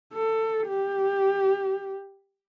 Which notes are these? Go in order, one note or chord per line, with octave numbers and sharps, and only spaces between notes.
A4
G4